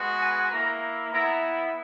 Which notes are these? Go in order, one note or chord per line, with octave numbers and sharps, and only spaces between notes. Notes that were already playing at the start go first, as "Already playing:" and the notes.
Already playing: G#3 B3 F#4
G#5
A#3 E4 A#5
B3 E4 A#5